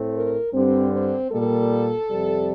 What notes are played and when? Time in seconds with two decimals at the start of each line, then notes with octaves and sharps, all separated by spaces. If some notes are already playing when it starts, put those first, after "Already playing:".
Already playing: A2 A3 C4
0.14 A#4
0.52 G2 D3 G3 C4
0.92 C4
1.30 A#2 G3 A#3 A4
2.08 F2 C3 G3